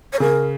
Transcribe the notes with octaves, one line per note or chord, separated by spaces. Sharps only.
C#5
C#3 A#4